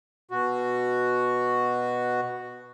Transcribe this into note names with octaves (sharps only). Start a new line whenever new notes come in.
B2 F#4